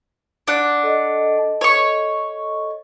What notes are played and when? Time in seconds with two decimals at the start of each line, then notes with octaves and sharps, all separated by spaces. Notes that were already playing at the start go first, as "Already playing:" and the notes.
0.48 D4 F#5
0.83 A4 D#5
1.61 C#5 C#6